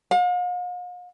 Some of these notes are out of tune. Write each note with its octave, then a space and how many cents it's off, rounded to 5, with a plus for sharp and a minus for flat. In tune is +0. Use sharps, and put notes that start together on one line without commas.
F5 +45